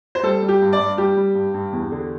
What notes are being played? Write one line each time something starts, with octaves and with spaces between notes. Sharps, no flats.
C5
G3 A4
G3
G4
G2
D5
G2
G3 G4
G3
G2
G2
E2
D3